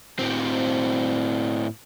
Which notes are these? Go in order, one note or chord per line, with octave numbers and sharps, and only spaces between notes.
A2 C4